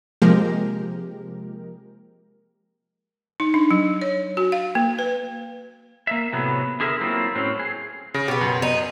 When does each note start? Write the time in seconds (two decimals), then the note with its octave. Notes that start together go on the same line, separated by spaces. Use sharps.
0.22 C3 F3 G#3 A#3 G4 A#4
3.40 D#4
3.54 D4
3.71 F#3
4.01 C#5
4.37 F#4
4.52 F5
4.75 A#3
4.99 B4
6.07 A#3 E5
6.32 A2 C3 F#3 A3 B3
6.80 D3 G#4 A#4 E5
7.00 F#3 A#3 C4 E4 F4
7.35 A2 F#3 C4 C#4
7.59 G#4
8.14 C#3 A#6 D7
8.28 B2 B3 G4
8.41 F#2
8.62 D#4